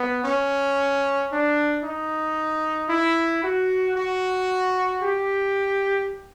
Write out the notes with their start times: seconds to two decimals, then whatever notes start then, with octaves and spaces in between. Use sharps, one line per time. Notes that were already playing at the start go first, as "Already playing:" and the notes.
Already playing: B3
0.24 C#4
1.30 D4
1.83 D#4
2.90 E4
3.43 F#4
3.96 F#4
5.02 G4